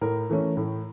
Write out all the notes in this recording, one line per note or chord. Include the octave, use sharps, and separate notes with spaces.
A2 A#4
E3 A3 C#4
A2